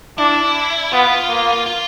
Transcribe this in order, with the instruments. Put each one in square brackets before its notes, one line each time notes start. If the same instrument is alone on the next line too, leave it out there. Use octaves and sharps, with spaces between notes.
[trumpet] D4 [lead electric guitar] E4
[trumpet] B3 [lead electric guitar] F4
[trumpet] A#3
[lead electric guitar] F4